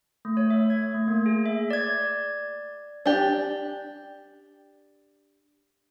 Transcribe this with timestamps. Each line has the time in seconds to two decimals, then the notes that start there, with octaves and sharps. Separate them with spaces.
0.25 A3
0.37 C#5
0.50 E5
0.70 G#6
0.94 A3
1.08 A#3
1.26 G#4
1.46 E5
1.70 D5 G#6
3.06 D4 G4